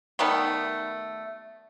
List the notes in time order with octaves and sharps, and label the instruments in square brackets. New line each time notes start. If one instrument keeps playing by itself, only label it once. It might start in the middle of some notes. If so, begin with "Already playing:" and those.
[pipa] D#3 G3 A3 B3